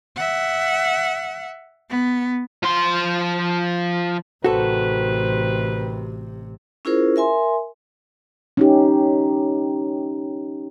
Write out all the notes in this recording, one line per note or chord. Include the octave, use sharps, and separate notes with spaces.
E5 F#5
B3
F3 C6
A1 C3 D#3 F#4 A4 B4 C5
C#4 E4 F4 G#4 A#4 C5
A#4 E5 G#5 C6
C#4 D#4 G4